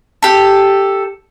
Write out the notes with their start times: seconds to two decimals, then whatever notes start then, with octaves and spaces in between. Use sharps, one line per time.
0.22 G4 A4